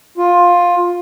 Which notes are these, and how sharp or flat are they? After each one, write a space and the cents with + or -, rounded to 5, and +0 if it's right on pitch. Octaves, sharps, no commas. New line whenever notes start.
F4 +10